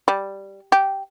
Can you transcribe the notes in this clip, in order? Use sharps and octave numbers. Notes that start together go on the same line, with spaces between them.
G3
G4